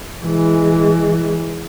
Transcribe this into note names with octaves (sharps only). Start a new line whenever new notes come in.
E3 G#3